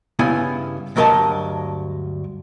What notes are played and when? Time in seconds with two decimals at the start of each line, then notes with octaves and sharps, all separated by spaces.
0.19 G2 C#3 B3 E4 G#5
0.96 D2 G2 F#3 A#4 D#5 A5